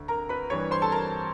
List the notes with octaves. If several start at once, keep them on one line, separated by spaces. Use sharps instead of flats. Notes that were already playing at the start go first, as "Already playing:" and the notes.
Already playing: D2 D3
A#4 A#5
B4 B5
G2 E3 G3 C#5 C#6
C5 C6
A4 A5
A#4 A#5